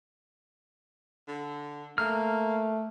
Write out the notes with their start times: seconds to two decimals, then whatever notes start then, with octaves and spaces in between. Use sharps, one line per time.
1.28 D3
1.98 A3 A#3 F6